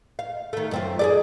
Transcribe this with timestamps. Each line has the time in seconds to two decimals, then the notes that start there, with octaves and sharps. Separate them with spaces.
0.19 F5
0.53 D#3 A3
0.71 F#2 C4 F4
0.99 G#4 A4 D5